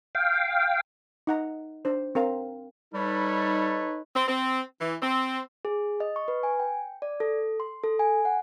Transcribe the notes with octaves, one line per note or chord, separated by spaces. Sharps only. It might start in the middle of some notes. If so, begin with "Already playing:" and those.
F5 G5
D#4 F#5 A#5
D4 C5
C4 A#4 F5
G3 D#4 A4 B4 C#5
C4
C4
E3
C4
G#4
D#5
C#6
B4
G#5
G5
D5
A4
C6
A4
G#5
F#5